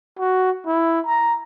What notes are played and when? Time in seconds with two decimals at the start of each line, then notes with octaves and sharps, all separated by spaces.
0.19 F#4
0.67 E4
1.06 A#5